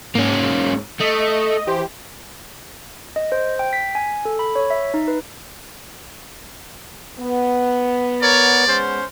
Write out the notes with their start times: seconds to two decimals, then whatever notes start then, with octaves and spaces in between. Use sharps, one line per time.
0.15 G#2 A#3 C#4
1.00 A3 D#5
1.67 E3 G4 C5
3.16 D#5
3.32 C5
3.59 G5
3.73 B6
3.95 G#5
4.25 A4
4.39 B5
4.56 C#5
4.70 E5
4.94 D#4
5.08 B4
7.19 B3
8.22 A#4 C#5 D5
8.67 G#3 B3 C#4 C5